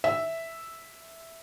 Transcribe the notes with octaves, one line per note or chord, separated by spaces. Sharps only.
E5